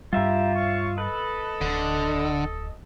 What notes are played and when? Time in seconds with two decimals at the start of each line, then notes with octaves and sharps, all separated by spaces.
0.13 G2 G3 E4 F4 G4 E5 A#5
0.55 C#5 F5 C#6
0.98 A4 B4 D#5
1.61 D1 D3